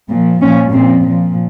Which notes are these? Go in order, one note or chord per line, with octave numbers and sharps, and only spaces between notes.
A#2 F3
A#2 F3 C#4
A#2 F3 C4
A#2 F3